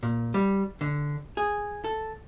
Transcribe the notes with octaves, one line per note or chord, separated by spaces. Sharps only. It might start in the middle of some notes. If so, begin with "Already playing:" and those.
A#2
G3
D3
G#4
A4